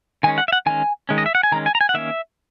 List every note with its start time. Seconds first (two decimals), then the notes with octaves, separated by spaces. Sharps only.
0.23 D#3 G#3 C#4 G#5
0.38 F#5
0.48 E5
0.53 F#5
0.66 D#3 G#3 C#4 G#5
1.09 D#3 G#3 C#4
1.18 D#5
1.26 E5
1.35 F#5
1.43 G#5
1.52 D#3 G#3 C#4 A#5
1.66 G#5
1.75 A#5
1.81 G#5
1.89 F#5
1.94 D#3 A#3 C#4 E5